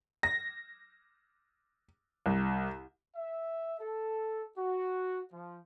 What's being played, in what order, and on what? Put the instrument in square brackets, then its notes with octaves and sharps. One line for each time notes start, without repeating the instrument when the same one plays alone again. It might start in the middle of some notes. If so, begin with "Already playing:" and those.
[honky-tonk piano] A#6
C2
[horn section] E5
A4
F#4
F3